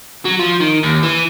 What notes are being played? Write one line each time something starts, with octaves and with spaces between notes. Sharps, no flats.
F#3
F3
D#3
D#2
E3